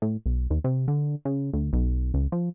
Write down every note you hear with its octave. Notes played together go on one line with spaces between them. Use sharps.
A2
B1
D#2
C3
D3
C#3
D2
B1
C#2
F3